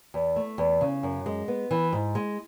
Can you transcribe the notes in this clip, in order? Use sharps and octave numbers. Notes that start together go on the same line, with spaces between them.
E2
A3
E2
C#3
F#2
G#3
B3
E3
G#2
G#3